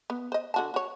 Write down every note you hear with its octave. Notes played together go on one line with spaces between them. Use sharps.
B3
C5 D#5
D3 F#4 A5
F#4 C#5